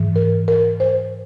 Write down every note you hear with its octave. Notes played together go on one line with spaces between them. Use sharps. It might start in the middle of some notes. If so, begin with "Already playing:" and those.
Already playing: G#2 E3
A#4
A#4
C5